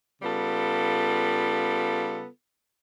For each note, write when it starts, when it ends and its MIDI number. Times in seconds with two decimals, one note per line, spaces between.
0.22 2.26 49
0.22 2.26 55
0.22 2.26 59
0.22 2.26 65
0.22 2.26 69